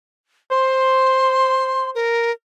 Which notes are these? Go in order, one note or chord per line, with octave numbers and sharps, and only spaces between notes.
C5 C6
A#4